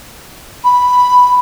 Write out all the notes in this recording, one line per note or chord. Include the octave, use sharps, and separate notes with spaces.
B5